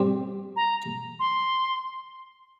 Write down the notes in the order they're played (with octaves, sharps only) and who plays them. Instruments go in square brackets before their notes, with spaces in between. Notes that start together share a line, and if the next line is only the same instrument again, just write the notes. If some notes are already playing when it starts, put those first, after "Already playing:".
Already playing: [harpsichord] G3 C4 G4
[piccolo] A#5
C6